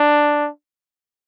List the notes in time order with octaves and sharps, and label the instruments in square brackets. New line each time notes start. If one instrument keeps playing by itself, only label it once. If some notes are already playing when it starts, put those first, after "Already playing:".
Already playing: [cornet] D4